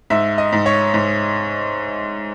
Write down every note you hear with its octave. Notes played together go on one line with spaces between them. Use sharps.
G#2 E5
D#5
G#2
C#5
G#2